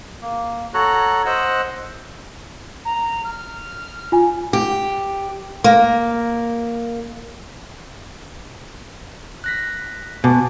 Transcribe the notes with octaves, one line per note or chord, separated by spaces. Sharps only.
A#3
F#4 A4 C#5 A#5 F#6
C5 D#5 F#5 E6 F#6
A#5
F6
F4 G#5
G4
A#3
F#6 A#6 B6
B2 G#5 A5 D6